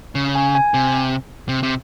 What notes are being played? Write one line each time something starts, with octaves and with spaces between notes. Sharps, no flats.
C#3
G#5
G#5
C3
C3
C3